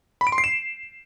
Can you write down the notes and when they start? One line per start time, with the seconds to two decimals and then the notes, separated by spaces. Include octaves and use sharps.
0.21 B5
0.27 D7
0.32 C6
0.38 C7
0.44 E7